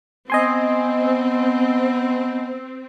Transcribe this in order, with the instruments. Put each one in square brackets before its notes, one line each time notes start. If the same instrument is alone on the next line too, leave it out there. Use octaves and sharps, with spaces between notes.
[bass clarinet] B3 [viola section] C4 [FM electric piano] D#5 G#5 C6